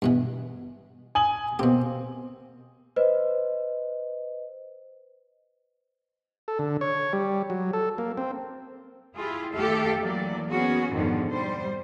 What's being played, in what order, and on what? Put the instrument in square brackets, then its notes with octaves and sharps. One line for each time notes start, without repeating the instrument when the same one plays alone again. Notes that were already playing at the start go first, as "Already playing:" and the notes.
[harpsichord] G2 B2 E3
[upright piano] G#5 D#6 F#7
[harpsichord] B2 G4 [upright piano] A#3 C4
[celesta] B4 C5 D#5
[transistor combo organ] A4
D3
C#5
G3
F#3
A4
A#3
C4
[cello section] E4 F4 G4 G#4
D#2 A3 G4 A4 E5 F5
E3 F#3 A#3 D5
A#3 B3 C#4 F#4 G#4
F2 G#2 B2 D3 D#3 F3
G3 C5